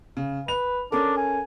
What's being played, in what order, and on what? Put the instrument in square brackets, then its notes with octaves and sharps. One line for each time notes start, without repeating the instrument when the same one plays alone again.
[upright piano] C#3
[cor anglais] B4 [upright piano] F7
[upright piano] C#4 A4 A#4 [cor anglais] D4
[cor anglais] G#5